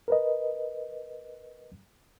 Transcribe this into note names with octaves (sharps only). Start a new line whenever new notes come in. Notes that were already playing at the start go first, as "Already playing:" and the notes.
A#4 B4 D#5